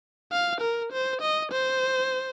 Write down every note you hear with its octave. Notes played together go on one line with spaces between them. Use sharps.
F5
A#4
C5
D#5
C5